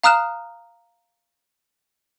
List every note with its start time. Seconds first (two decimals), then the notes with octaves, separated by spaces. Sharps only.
0.03 F5 A#5 D#6 F6 F#6 E7